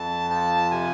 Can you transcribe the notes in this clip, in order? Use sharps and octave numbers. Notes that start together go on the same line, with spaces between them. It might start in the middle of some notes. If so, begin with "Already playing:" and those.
Already playing: F2 A5
F3 A5
C3 G#5